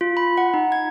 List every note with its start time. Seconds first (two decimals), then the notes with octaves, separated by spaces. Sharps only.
0.01 F4
0.17 B5
0.37 F#5
0.54 D#4
0.72 G#6